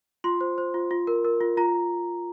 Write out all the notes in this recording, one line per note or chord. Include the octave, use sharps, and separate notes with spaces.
F4 C6
C5
C5
F4
F4
A#4
A#4
F4
F4 A#5